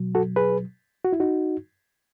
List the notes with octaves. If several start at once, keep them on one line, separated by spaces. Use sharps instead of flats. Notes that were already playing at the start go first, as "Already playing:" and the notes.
Already playing: B2 F#3
F#4 A4
G#4 B4
F#4
E4
D#4 F#4